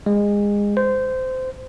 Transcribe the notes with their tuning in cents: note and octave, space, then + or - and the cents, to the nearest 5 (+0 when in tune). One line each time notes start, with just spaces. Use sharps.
G#3 -25
C5 -20